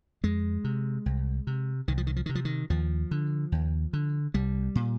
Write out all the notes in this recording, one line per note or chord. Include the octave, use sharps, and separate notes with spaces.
F2 G#3
C3
C2
C3
C2 D#3
F3
D#3
F3
C3 D#3
F3
D#3
D#2 F3
D3
D#2
D3
C2 G3
A#2